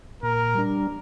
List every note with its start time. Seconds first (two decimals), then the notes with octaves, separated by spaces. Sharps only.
0.23 A#2 A#4
0.55 G3 D4